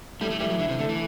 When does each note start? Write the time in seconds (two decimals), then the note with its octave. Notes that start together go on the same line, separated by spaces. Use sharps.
0.21 A2 G3
0.31 A3
0.40 E3 G3
0.50 F#3
0.59 D3 E4
0.69 C3
0.79 D3 A3
0.89 E3